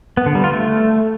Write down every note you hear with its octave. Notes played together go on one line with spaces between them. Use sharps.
B3
D3
G3
F4
A3